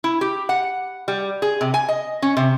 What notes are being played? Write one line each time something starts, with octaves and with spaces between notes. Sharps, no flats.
E4
G4
F#5
G3
G#4
C3
G#5
D#5
C#4
C3